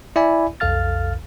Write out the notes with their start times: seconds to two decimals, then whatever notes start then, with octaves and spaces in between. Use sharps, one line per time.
0.16 E4 D5 E5 G#5 B5
0.60 B1 F2 A4 F5 F6 A6